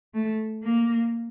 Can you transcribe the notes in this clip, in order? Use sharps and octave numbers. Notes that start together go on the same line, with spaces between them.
A3
A#3